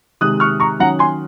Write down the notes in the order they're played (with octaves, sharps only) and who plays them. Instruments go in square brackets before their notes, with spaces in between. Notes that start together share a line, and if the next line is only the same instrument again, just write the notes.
[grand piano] C3 D#3 G#3 D#6 F#6
C#6 F6
A#5 C#6
D#3 F#3 C#4 F#5 A#5
G#5 C6